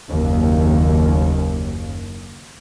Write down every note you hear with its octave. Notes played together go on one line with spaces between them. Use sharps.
F#1 D#2